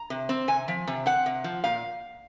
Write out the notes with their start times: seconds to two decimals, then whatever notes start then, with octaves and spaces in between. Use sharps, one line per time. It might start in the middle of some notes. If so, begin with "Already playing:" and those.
Already playing: A#5
0.10 C3
0.29 C4
0.48 C3 G#5
0.68 F3
0.87 C3
1.06 C4 F#5
1.26 C3
1.44 F3
1.64 A#2 F5